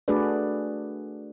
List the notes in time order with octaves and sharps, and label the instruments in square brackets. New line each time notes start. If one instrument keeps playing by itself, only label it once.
[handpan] A3 D4 F#4 G#4 B4 D5